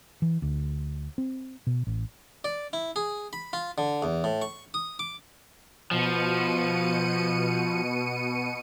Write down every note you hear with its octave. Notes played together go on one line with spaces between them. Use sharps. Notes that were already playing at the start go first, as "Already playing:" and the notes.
E3
D2
C4
B2
A1
D5
E4
G#4
B5
F4
D3
E2
A2
C#6
D#6
D6
B2 F3 C#7 D#7